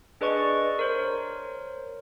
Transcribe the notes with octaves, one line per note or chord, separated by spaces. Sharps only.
D4 G#4 B4 D5 D#5 C#6
A#4 C5 C#5